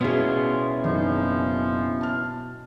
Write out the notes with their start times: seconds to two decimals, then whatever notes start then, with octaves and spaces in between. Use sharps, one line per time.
0.01 B2 B3 C#4 E4 F4 G#4
0.84 F#1 F3 D4 D#4
2.01 A5 F6